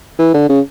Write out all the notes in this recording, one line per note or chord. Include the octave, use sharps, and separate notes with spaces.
E3
D3
C#3